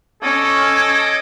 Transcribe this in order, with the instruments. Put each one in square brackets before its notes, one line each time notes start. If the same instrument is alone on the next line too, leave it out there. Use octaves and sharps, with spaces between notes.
[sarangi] C#4 [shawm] A4 [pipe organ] D#5 D6 D#6 [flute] G#6